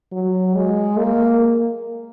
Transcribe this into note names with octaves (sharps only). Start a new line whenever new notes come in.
F#3
G#3
A#3